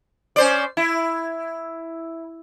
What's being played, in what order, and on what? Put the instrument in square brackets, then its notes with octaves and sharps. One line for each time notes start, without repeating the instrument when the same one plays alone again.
[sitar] C#4 C5 D5
E4